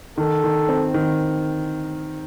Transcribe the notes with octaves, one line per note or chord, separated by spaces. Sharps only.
D#3 A4
D#3
C4
D#3